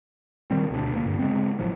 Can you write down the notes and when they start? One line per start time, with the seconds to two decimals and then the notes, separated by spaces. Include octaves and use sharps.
0.51 A#2 D#3 G3 C4
0.71 D2 B2 A#3 D4
0.92 D2 A#3
1.06 G2 D3
1.19 C#3 G#3 B3 C4
1.59 A1 A2 F3 F#3